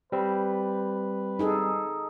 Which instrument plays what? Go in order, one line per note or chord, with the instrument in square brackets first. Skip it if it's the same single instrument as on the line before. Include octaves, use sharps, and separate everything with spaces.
[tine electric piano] G3 C4 [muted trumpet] B4
[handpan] D#4 G#4 A4